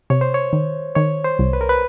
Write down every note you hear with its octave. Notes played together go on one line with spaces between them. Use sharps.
C3 C#5
C5
C#5
D#3
D#3 C#5
C5
C2
B4
A#4
B4